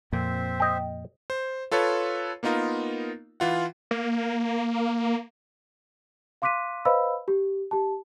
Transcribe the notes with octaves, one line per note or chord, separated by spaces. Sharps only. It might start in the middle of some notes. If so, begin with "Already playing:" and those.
F2 A#2 C4 C5 E5
D#5 G5
C5
F4 A4 B4 C#5
A#3 B3 D#4 F4 A#4
E3 F4 F#5
A#3
F5 C6 D6 F#6 B6 D#7
B4 C5 D#5 F5 B5 E6
G4
G4 A5